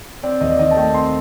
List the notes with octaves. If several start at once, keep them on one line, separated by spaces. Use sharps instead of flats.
C4 D5
D#2 D#5
D5
D#3 D#5
A5
A3 G5
C4 C6